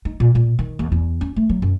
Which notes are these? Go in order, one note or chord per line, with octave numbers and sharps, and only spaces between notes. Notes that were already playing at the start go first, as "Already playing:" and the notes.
D#4
A#2
A#2
D#3
D#2
E2
C#4
A3
F#3
F#2